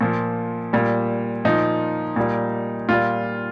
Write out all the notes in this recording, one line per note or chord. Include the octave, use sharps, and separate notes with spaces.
A#2 F3
A#2 G3
A#2 F3 D#4
A#2 G3
A#2 G3 F4